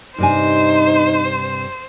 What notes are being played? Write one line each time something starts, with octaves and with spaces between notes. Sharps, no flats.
G2 C3 D#4 C5 G#5